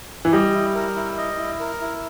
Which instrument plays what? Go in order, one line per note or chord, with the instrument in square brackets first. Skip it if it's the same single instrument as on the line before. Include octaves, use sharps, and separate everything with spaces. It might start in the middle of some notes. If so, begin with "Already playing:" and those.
[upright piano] E3
[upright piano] G3 [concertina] D#5
[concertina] E4
A#4
E4
D#5
E4
A#4
E4